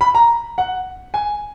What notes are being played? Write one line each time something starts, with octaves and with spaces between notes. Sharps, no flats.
B5
A#5
F#5
G#5